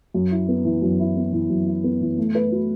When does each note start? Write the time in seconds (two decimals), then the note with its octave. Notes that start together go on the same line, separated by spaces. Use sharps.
0.14 F#2
0.31 E4
0.48 B3
0.65 E3
0.82 F#2
0.99 E4
1.16 B3
1.33 E3
1.50 F#2
1.67 E4
1.84 B3
2.01 E3
2.18 A3
2.35 B4
2.52 F#4